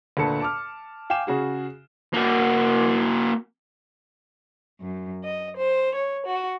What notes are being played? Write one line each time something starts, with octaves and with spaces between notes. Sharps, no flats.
D2 A#2 A4 B4 A5 C#7
A5 D6 F6
F5 G5 G#5 D6 E7
C#3 F#4 G#4
A#3 F#4
F#2
D#5
C5
C#5
F#4